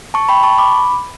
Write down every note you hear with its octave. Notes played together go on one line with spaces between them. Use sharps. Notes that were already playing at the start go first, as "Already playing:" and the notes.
A5 C#6
G5 B5
A5 C#6
B5 D6